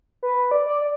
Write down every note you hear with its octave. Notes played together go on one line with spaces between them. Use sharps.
B4
D5
D5
D5